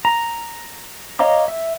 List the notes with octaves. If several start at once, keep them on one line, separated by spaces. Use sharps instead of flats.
A#5
C#5 D#5 F5 A#5 D6
E5